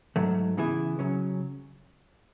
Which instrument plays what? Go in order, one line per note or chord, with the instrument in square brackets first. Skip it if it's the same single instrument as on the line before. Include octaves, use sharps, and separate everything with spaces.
[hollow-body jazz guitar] G#2 F#3 A3
C#3 E3 B3 E4 G#4
C#3 F#3 C#4